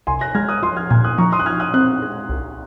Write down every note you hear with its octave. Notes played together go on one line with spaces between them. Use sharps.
C2 G#5 C6
F#6 A#6
G#3 F6 G#6
D#6 F#6
F3 C6 D#6
F6 G#6
A#2 F6 G#6
D#6 F#6
F3 A#5 C#6
C6 D#6
F#6
F3 F6 G#6
D#6 F#6
C4 D#6 F#6
G#3
C2